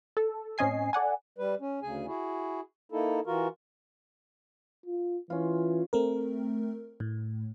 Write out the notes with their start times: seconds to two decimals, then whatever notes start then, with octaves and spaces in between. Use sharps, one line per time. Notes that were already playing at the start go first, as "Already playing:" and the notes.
0.17 A4
0.58 A2 C4 C#4 D#5 G#5 C7
0.93 A4 D5 F#5 G#5
1.38 G3 B4
1.61 C#4
1.83 D2 C#3 G#4 G#5
2.07 E4 F#4 G#4
2.92 A#3 D#4 E4 A4
3.26 E3 F4 F#4 A#4
4.86 F4
5.30 E3 C#4 F4
5.93 A3 C4 A#4
7.00 A2